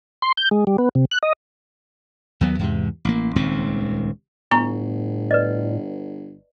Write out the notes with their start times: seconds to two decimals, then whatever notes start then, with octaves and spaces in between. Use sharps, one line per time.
0.22 C6
0.37 G6
0.51 G#3
0.67 G3
0.78 B3
0.95 C3
1.11 F#6
1.23 D#5
2.41 D#2 F#3 B3
2.59 E2 G#2 C3
3.05 A1 A#3
3.36 D#1 C#2 D#3 C4
4.51 G1 A2 B3 A#5 C#6
5.31 B4 D5 D#5